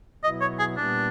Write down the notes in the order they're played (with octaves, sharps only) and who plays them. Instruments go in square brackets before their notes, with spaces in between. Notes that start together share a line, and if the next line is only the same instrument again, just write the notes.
[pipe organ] B2 F#3 B3 E4 [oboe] D#5
[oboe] C#5
G#4
[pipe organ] A#2 G3 B3 [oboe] D4